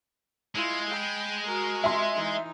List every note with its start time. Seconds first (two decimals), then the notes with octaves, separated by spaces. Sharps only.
0.55 G#3 E4 F4
0.90 G5 B5
1.46 F#4 A#4
1.84 E5 C6
2.15 E3 D#4